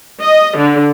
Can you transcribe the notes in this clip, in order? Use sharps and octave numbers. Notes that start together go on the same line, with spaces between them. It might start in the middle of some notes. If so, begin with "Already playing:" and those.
D#5
D3